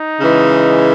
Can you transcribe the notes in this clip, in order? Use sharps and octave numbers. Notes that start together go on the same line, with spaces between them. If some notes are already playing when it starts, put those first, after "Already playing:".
Already playing: D#4
C#3 E3 G#3